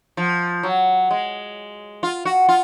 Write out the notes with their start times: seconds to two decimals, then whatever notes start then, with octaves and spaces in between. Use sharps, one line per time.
0.17 F3
0.63 F#3
1.11 G#3
2.03 F4
2.25 F#4
2.49 F4